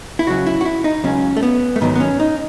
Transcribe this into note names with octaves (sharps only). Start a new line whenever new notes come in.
E4
C#2 C#3 F#3 F#4
E4
F#4
E4
D#4
C#2 C#3 F#3 C#4
A3
B3
A3
G#2 D#3 F#3 B3
B3
C#4
D#4